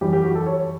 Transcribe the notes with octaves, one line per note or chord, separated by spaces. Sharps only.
F#2 E3 G3 G4
G4
F#4
A4
C#5